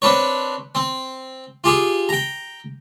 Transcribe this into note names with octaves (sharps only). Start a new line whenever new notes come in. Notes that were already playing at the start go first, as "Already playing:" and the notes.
C4 D4 B4 C#5
C4
F4 G4 G#4
G5 A#5